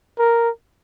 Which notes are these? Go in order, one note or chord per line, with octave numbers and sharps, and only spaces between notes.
A#4